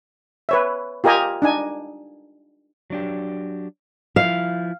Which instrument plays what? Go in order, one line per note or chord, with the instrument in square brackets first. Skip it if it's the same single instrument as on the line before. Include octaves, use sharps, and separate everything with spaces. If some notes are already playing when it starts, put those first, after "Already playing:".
[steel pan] B4 C#5 E5
F4 G4 A#4 D#5 G#5 A#5
D4 D#4 G#5
[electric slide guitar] F#3 D4 G4
[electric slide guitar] F3 E4 [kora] F5